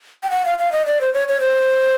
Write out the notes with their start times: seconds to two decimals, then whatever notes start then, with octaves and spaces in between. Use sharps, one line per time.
0.23 G5
0.31 F#5
0.45 F5
0.59 F5
0.72 D#5
0.86 D5
1.01 C5
1.14 C#5
1.28 C#5
1.40 C5